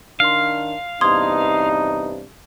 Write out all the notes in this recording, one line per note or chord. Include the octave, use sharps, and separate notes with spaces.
D#3 D4 F5 C6 F6
E2 G2 C3 D#4 C6 D#6 G#6